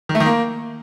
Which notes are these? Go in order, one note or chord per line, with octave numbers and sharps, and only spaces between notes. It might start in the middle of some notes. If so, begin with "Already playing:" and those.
D#3
A3
D#3
A#3